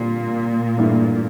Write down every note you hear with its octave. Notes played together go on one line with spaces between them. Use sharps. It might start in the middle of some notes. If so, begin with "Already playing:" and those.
Already playing: A#2 D3 G3 C4
G2 E3 A3 D4